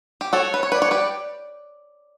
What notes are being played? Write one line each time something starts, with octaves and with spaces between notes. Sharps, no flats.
G4
F#4 A4 C#5
B4
C#5
B4 D5
C#5
G4 B4